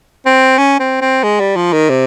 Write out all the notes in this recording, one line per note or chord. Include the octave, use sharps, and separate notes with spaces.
C4
C#4
C4
C4
G#3
G3
F3
D#3
C3